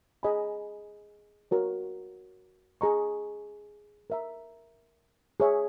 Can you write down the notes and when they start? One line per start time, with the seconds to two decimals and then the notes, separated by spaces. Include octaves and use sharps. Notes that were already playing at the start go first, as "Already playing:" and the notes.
0.23 G#4 D#5 G#5 B5
1.51 F#4 A#4 C#5
2.81 G#4 D#5 A#5 C#6
4.10 A#4 E5 A#5
5.40 G#4 C#5 E5